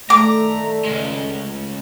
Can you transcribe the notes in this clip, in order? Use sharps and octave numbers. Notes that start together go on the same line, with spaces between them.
D#3 A3 D5 A#5 D6
C#2 G#3